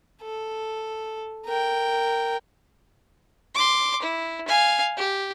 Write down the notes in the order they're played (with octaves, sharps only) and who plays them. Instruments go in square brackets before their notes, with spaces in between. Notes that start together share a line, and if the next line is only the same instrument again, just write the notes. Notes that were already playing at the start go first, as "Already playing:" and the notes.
[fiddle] A4
A#4 G5
C6 D6
E4
F5 G#5
G4